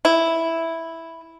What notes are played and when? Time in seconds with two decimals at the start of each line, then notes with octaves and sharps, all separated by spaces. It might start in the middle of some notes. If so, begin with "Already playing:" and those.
0.05 E4